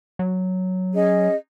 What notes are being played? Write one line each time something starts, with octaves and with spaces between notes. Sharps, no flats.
F#3
C#4 G#4 D#5